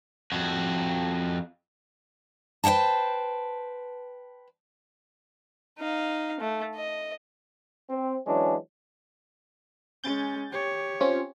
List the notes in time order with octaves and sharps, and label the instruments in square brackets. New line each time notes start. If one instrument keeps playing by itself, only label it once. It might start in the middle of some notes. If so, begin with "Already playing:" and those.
[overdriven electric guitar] F2 F#4
[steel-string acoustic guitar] B4 C5 F#5 G5 A5
[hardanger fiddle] D#4 F5
A3
D#5
[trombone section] C4
E3 F#3 G#3 C#4 D4
[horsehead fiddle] G#3 C#4 [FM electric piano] G6 A6
[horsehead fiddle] G4 C#5
[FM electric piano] C4 C#4 F4